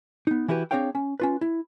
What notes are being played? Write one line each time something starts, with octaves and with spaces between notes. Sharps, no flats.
B3 D#4
E3 E4 F#4 G4 B4
C4 D4 G#4 C#5 F5 G5
C#4
C#4 F4 B4
E4